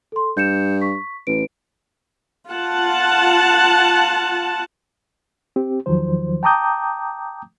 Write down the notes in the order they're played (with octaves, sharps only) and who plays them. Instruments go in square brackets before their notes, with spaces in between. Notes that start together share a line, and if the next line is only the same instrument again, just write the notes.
[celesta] A4 C6
[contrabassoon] G2 [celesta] G6 C#7 E7
[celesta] C#6 B6
[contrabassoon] A1 [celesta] B4 D7
[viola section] F4 F#5 A5
[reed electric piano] C4 G4
E2 D#3 F3 F#3 C5
G5 A5 A#5 D6 D#6 G6